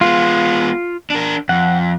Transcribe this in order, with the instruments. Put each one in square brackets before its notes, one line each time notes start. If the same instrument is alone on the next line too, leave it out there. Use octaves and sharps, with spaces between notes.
[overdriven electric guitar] G#3 B3 [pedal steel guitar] F4
[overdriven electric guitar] D4 A#4
[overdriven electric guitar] F2 [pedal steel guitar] F#5